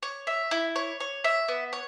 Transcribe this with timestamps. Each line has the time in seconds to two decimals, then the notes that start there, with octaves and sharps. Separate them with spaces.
0.03 C#5
0.27 E5
0.51 E4
0.76 C#5
1.00 C#5
1.24 E5
1.48 B3
1.73 C#5